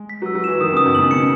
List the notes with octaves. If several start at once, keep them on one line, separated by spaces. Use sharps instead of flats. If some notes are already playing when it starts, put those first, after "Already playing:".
Already playing: G#3
B6
F#3
E6
F#3
E3 E7
D#3 D#6
C#3
D#6
B2
C#3 F#7
C#3 C#7